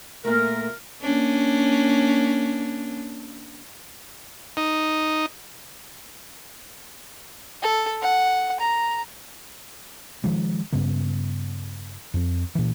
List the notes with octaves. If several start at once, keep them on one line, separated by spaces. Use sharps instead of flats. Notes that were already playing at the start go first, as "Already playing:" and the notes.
A#2 A3 A#4
A#3 C#4 D4
D#4
A4
F#5
A#5
D#3 F3 G#3
G2 C#3 B3
F2 C4
A#2 E3